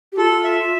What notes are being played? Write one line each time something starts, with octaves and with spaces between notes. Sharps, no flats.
G4
F4 A4
E5